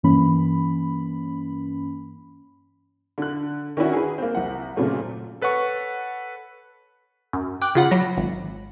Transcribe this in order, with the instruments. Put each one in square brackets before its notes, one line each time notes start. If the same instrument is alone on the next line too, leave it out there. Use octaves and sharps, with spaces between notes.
[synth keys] G2 E3 A#3 C#4 B5
[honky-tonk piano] D3 F#6
D#3 C#4 D4 E4 F#4
G#4 B4
A#3 C4
C2 F#5
F#2 A#2 C#3 A3 C4
[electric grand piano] A4 B4 C#5 F#5 C#6
[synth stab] F#2
G5 D6 F#6
C#3 F4 F#5 B5
F#3 B5 A#6
G#1